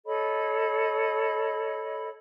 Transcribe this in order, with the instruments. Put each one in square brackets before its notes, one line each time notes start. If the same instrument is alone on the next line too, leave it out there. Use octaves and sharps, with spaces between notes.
[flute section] A4 C#5 D#5 B5